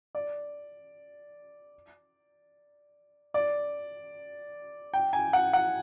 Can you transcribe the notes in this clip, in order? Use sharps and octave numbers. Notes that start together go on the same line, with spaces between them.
D5
D5
G5
G#5
F#5
F#5